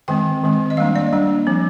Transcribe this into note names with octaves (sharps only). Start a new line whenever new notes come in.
D#3 G#3 C4 G5
D#3 G#3 C4
D#5
G3 A#3 D4 F5
D5
G3 A#3 D4
F3 C4